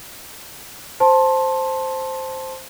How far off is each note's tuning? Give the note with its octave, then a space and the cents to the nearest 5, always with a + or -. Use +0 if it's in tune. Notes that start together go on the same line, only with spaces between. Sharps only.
C5 +0 A5 +0 C6 +20